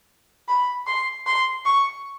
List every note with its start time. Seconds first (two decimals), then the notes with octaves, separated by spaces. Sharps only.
0.49 B5
0.88 C6
1.27 C6
1.66 C#6